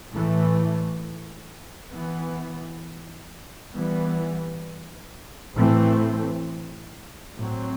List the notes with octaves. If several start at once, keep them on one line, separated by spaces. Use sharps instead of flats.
A2 E3 A3
E3 B3
E3 G3 B3
A2 E3 A3 C4
A2 F#3 C4